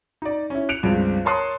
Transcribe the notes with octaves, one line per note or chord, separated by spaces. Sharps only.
D#4 D5
C#4 E4
F#6 C#7 D7 F7
C#2 G2 F3 G#3 C4
A#4 C#5 A5 C6 D#6 F#6